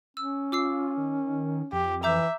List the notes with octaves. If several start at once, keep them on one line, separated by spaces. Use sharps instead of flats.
C#4 E6
F4 D6 E6 C7
D#3
F2 G4
E3 E5 A#5 D6 G6